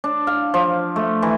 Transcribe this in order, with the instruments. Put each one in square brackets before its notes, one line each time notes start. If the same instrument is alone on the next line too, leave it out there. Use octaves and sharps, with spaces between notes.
[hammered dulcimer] D4
F5
F3
A3
E3